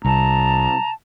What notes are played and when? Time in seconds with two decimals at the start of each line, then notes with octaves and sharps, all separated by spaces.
0.04 C2 A5 A#5